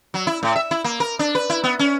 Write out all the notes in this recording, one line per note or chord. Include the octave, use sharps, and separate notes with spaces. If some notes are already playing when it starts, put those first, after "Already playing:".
F#3
E4
A2
E5
E4
A#3
A#4
D4
B4
E4
B3
C#4